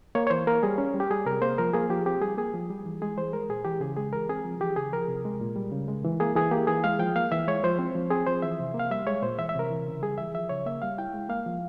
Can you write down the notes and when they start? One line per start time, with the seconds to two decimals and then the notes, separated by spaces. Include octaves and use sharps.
0.15 A#3 C#5
0.27 C#5
0.30 E3 C5
0.47 A#3 A#4
0.63 G3 G#4
0.78 C#4
0.94 G3
1.00 G4
1.10 G3 G#4
1.26 C3 A#4
1.42 A#3 C5
1.58 F3 A#4
1.73 A#3 G#4
1.90 F3 G4
2.06 C4 G4
2.21 G3 G#4
2.37 A#3 G#4
2.54 F3
2.70 G3
2.85 E3
3.02 G#3 G#4
3.17 E3 C5
3.33 G#3 A#4
3.49 A#2 G#4
3.65 E3 G4
3.81 C#3 G#4
3.97 G#3 G#4
4.12 E3 A#4
4.29 C4 G#4
4.45 F3
4.60 E3 G4
4.76 C#3 G#4
4.92 F3 A#4
5.08 C3
5.25 G#3
5.41 A#2
5.56 G3
5.72 C#3
5.88 G#3
6.05 E3
6.20 A#3 G#4
6.35 E3 G#4
6.51 A#3 G4
6.67 E3 G#4
6.84 G#3 F5
6.99 F3 G5
7.16 A#3 F5
7.32 E3 E5
7.48 G#3 C#5
7.64 F3 C5
7.79 C4
7.95 F3
8.11 C4 G#4
8.27 F3 C5
8.42 E3 E5
8.60 C3
8.74 A#3
8.79 F5
8.91 G3 E5
9.07 G#3 C#5
9.22 A#2 C5
9.38 E3 E5
9.49 E5
9.55 C3 A#4
9.70 E3
9.87 C#3
10.02 G3 G#4
10.18 E3 E5
10.34 F3 E5
10.49 C#3 C#5
10.66 A#3 E5
10.82 G3 F5
10.98 E4 G5
11.14 G#3
11.29 A#3 F5
11.46 F3